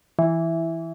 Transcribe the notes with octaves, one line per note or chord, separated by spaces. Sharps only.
E3